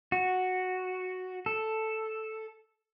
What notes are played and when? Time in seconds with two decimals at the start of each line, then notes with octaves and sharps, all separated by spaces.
0.12 F#4
1.46 A4